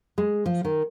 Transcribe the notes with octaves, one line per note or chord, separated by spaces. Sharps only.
G#3
F3
D#3